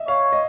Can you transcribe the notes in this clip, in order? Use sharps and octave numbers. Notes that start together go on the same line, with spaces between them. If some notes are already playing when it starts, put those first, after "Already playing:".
Already playing: D#5 E5
C#5 F5
D#5